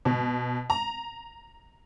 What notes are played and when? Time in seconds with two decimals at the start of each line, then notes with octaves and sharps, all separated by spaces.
0.05 B2
0.70 A#5